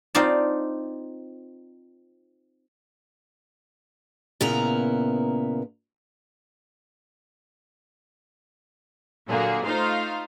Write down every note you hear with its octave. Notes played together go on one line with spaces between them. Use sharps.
C4 D#4 F4 D5 A5
A#2 C#3 B3 E4 A#4 A#5
A#2 D3 F#3 A#3 G#4
A3 D#4 F4 C5 F5